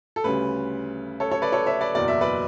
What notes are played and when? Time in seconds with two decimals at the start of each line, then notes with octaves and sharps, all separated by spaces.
0.16 A4
0.24 D2 C#3 G3 C#4 B4
1.20 A4 C#5
1.31 A4 C#5
1.42 B4 D5
1.52 A4 C#5
1.66 C#5 E5
1.81 B4 D5
1.95 F#1 E2 B2 F#3 D5
2.08 E5
2.21 B4 D5